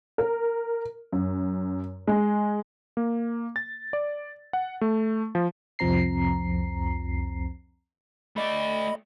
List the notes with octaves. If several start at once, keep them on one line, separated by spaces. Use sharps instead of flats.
A#4
F#2
G#3
A#3
A6
D5
F#5
A3
F3
C2 F2 F3 C4 A#5 C7
A3 D5 D#5 B5